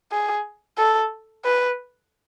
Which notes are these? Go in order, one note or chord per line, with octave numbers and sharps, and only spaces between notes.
G#4
A4
B4